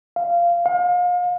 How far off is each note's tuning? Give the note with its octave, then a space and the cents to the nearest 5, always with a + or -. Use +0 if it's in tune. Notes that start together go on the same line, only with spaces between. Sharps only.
F5 -15
F5 +35